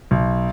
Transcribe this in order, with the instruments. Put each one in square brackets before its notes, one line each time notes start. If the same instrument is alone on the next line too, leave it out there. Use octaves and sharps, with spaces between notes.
[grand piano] B1